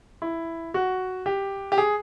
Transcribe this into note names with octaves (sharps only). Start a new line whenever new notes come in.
E4
F#4
G4
G4
G#4